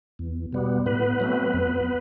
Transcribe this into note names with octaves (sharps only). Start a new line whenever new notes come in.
E2
B2 G3 B3
A2 B3 B4
F#3 A3 C4
F2